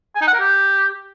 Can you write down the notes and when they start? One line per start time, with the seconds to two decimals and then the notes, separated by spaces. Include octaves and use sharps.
0.15 G#5
0.21 D#4
0.28 F#5
0.34 A#4
0.40 G4